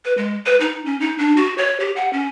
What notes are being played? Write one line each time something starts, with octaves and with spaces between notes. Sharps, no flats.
B4
G#3
B4
D#4
C#4
D#4
D4
F#4
C#5
G4
F#5
C#4